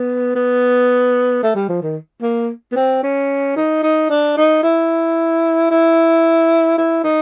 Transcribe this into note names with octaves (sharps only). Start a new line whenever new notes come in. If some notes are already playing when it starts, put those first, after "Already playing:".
Already playing: B3
B3
A3
G3
F3
D#3
A#3
B3
C4
C#4
D#4
D#4
D4
D#4
E4
E4
E4
D#4